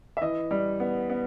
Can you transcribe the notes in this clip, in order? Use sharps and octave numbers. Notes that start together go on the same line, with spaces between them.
E5
E3 D#5
G3
B3
B3